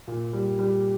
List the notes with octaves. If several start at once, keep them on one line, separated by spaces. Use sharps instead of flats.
A#2
G3
G3